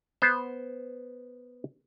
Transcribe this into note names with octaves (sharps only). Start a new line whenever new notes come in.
B3 C5